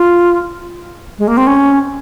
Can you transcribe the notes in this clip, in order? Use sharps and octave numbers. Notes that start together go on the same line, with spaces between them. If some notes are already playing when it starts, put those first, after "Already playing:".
Already playing: F4
G#3
A#3
C4
C#4